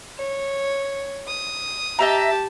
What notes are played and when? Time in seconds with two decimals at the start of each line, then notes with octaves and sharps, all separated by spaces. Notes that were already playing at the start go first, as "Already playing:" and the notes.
0.18 C#5
1.27 D#6
1.99 G4 D#5 E5 A5 A#5